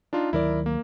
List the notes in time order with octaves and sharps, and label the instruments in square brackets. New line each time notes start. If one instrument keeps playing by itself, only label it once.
[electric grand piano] D4 D#4 F4
[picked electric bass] D2 D#3 F#3 [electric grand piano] E4 A#4 D5
[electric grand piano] A#3